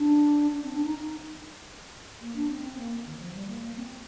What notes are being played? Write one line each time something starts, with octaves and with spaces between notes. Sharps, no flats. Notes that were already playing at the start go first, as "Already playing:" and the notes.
Already playing: D4
D4
C4
D4
D#4
A#3
D4
C4
C4
A#3
D#3
F3
G3
A#3
A#3
C4